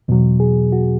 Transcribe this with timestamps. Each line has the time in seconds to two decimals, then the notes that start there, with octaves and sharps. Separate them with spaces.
0.08 E2 B2 F#3
0.40 G#4
0.72 F#4